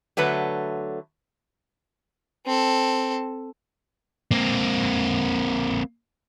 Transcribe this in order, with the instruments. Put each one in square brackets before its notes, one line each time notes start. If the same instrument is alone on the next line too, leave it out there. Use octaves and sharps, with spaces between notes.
[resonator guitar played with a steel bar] D3 F#3 A3 B4
[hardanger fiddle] C4 A4
[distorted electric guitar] A#3 C4